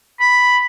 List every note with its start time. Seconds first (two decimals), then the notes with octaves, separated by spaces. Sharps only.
0.20 B5